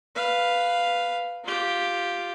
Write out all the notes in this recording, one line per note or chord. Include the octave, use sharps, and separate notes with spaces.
B4 F5
F4 G4